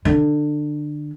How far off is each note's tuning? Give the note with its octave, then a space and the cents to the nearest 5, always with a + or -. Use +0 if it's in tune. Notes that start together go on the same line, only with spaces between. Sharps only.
D3 +20